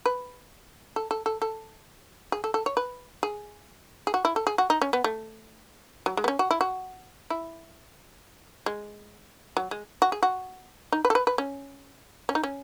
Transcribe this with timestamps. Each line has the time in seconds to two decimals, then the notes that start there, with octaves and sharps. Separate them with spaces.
0.06 B4
0.96 A4
1.11 A4
1.26 A4
1.42 A4
2.32 G#4
2.44 A4
2.54 A4
2.66 C#5
2.77 B4
3.23 G#4
4.07 G#4
4.14 F#4
4.25 E4
4.36 A4
4.47 G#4
4.58 F#4
4.70 D#4
4.81 C#4
4.93 B3
5.04 A3
6.06 F#3
6.17 G#3
6.24 B3
6.28 C#4
6.39 F#4
6.51 E4
6.61 F#4
7.30 E4
8.66 G#3
9.57 F#3
9.71 G#3
10.02 F#4
10.12 G#4
10.23 F#4
10.92 D#4
11.05 B4
11.10 A4
11.15 B4
11.27 B4
11.38 C#4
12.29 C#4
12.35 D#4
12.43 C#4